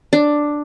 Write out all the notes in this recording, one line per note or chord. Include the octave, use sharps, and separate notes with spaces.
D4